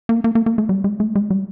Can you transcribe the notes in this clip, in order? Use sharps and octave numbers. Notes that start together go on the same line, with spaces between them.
A#3
A#3
A#3
A#3
A3
G3
G#3
A3
G#3
G3